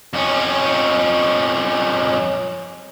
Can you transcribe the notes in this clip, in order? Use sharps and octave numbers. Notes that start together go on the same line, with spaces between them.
F2 C#4